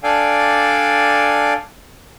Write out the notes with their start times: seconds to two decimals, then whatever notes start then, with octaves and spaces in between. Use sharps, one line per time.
0.03 D4 A4 D5 F5 G5 G#5